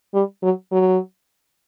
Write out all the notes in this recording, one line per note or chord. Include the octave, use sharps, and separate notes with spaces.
G3
F#3
F#3